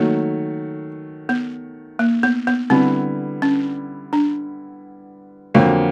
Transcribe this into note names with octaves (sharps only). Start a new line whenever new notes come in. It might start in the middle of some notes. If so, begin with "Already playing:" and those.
Already playing: D#3 F#3 A3 A#3
B3
A#3
B3
B3
D3 G3 B3 C4 E4
C#4
D4
F2 D3 F#3 A#3 F#4